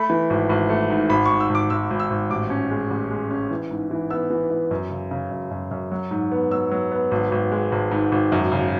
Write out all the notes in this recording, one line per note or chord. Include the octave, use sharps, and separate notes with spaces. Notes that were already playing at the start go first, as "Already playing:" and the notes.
Already playing: A3 B5
E3
G#1
G#1
A3
G#2
G#1 B5
C#6
G#2
E6
G#1
D6
G#1 E6
G#1
E6
G#1
A1 D6
C#4
G#3
A1
G#3
C#4
E3
G#2
E3
B3 E6
E3
E3
F#2
C#3
C#3
F#2
F#2
F#2
F#3
G#2
B3
F#3 E6
F#3
B3
G#1
G#1
G#3
G#1
G#2
G#1
F#2
C#3